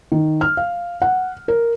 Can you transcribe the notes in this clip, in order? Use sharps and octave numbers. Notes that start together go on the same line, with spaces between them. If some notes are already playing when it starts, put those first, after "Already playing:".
D#3
F6
F5
F#5
A#4